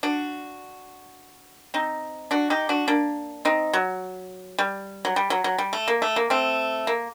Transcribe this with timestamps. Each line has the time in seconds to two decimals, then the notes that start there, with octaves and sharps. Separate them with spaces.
0.03 D4 F#4
1.74 C4 D#4
2.31 D4 F#4
2.50 D#4 G4
2.69 D4 F#4
2.88 A#3 D4
3.45 C4 D#4
3.73 F#3
4.59 G3
5.05 F#3
5.16 G3
5.30 F#3
5.44 F#3
5.58 G3
5.73 A3
5.88 A#3
6.02 A3
6.16 A#3
6.30 A3 C4
6.87 A#3